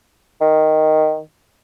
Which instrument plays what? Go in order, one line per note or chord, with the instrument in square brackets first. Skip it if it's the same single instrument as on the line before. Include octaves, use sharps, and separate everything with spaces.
[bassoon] D#3